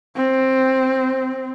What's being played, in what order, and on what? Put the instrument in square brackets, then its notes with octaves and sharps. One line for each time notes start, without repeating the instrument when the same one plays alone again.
[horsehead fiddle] C4